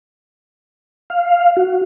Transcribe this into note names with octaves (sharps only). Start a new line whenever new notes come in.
F5
F#4